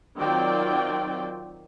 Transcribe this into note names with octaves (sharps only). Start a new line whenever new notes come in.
D#3 F#3 C4 F4 D5 G5